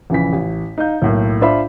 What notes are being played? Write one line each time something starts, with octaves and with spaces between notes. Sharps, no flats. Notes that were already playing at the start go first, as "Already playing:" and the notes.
A#1 C#3 E3 B6
A1
D#4 F5 G6
B1 A2 A#3
D4 F4 C5 E5 B5